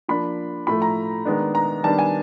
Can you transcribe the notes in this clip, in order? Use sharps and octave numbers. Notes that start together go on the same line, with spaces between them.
F3 A#3 D4 B5
A2 F3 A3 B5
A#5
D#3 G#3 B3 D4
A#5
D#3 G3 B3 D4 A5
G#5